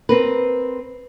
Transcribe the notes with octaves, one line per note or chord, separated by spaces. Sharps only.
C4 A#4 B4